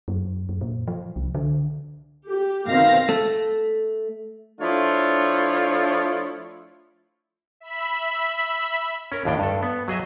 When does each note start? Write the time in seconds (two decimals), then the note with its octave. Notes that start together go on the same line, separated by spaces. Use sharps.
0.08 F#2
0.49 F#2
0.61 A#2
0.88 F3
1.16 C2
1.35 D3
2.29 G4
2.66 B2 D#3 C4 F5 A#6
3.09 A3
4.61 F3 A3 D4 E4 F4 C#5
7.60 E5 B5
9.12 C#4 A#4
9.25 D#2 A2 D4 G5
9.39 G2 A4
9.63 B3
9.88 F#3 G#4 D#5 E5